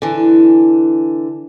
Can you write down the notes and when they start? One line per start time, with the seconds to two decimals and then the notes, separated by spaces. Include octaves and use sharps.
0.02 D3 E3